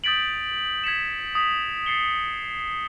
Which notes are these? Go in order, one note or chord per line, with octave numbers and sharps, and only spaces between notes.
D#6 G6 A6 B6 D7 F#7
G#6 B6 C#7 E7
D#6 B6
A6 C7 C#7 G7